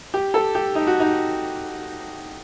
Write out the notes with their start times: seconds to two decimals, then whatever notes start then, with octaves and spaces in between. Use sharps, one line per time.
0.14 G4
0.34 A4
0.55 G4
0.75 D#4
0.87 F#4
1.00 D#4